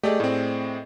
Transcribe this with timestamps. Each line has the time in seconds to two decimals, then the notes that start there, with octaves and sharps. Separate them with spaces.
0.03 A3 G4 G#4 D5 D#5
0.20 A2 C4